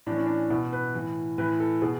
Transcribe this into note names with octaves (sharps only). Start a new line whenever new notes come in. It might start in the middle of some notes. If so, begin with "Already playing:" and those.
A2 E3 D4
C#4
D4
B2 E4
B4
A2 E3
A2 E3 B4
A4
B2 G#4